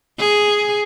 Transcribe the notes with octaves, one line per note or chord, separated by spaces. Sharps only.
G#4